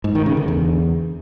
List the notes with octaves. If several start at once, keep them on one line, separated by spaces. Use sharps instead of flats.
G#2
D#3
C#3
D3
E2